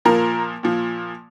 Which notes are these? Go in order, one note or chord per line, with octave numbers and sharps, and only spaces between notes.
A#2 F3 A#4
A#2 F3